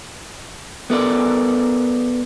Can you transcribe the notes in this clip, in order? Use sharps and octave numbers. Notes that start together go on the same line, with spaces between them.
B3 A4 A#4 D5